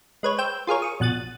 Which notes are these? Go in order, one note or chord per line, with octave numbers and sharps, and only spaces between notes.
G#3 B4 C#5
C5 G5 E6 G6
F4 G#4 A#4 C#5
C#6 D#6
A#1 B2 F#6 A6 D#7